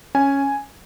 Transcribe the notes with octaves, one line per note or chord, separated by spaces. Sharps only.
C#4 G#5